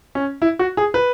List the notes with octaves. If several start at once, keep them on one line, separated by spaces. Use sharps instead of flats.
C#4
E4
F#4
G#4
B4